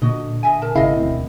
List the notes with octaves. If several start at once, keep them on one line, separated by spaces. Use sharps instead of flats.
A#2 D3 F#4 D#5
D#5 E5 G#5
A#4 A5
G#1 C#3 E4 A#4 D#5 F5
E1 D2 C4